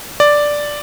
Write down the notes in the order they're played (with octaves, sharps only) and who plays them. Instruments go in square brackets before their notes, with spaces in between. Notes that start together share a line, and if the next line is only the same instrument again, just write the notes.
[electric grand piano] D5